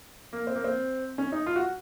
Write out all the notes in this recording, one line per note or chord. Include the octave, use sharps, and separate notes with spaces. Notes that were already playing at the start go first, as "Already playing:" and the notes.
A#3
C4
A#3
C4
C#4
D#4
F4
F#4